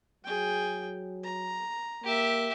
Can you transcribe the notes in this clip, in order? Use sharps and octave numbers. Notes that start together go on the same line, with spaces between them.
F#3 G#4 G5
A#5
A#3 G4 E5